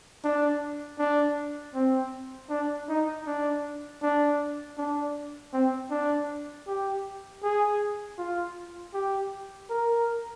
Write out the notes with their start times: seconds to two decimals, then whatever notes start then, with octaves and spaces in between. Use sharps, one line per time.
0.24 D4
0.99 D4
1.75 C4
2.50 D4
2.89 D#4
3.27 D4
4.03 D4
4.78 D4
5.53 C4
5.91 D4
6.67 G4
7.43 G#4
8.18 F4
8.94 G4
9.70 A#4